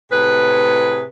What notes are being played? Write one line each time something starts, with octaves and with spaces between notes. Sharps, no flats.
A2 C3 G#4 B4